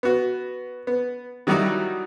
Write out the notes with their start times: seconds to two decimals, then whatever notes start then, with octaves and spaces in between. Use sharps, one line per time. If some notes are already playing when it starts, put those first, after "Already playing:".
0.03 B3 F#4
0.87 B3
1.47 D#3 F#3 G3 D#4 E4 F#4